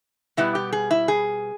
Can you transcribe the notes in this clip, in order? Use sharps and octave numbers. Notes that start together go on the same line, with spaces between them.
B2 G3 B3 E4
G4
G#4
E4
G#4